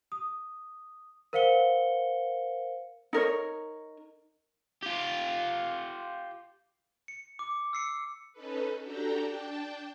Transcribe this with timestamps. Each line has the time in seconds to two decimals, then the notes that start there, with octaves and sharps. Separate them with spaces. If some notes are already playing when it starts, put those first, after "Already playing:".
0.12 D#6
1.33 A#4 C5 F5 F#5 C#7 G7
3.13 D#4 A#4 C#5
4.83 F4 G4
7.08 C#7
7.39 D6
7.73 E6 C7 C#7
8.33 C#4 D#4 A4 B4
8.82 D4 F#4 G4 A4 G5 A#5
9.22 D4 G5 A5